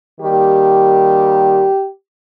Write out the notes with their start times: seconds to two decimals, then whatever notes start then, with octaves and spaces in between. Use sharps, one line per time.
0.20 D#3 G3 A#3 G4